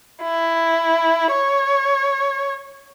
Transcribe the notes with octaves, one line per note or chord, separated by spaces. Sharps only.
E4
C#5